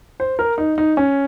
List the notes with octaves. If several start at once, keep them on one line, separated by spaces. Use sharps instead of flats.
C5
A#4
D#4
D#4
C#4